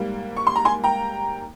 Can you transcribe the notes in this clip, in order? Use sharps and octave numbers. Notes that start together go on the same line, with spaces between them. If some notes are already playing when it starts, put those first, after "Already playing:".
Already playing: G#2 G3 A#3
C#6
C6
A#5
G#5 C6
G5 A#5